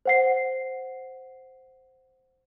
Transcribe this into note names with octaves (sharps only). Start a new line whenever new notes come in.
C5 F#5 C7